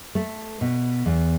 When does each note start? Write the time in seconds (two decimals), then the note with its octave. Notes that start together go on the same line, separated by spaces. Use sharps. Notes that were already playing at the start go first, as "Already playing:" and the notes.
0.15 A3
0.61 B2
1.06 E2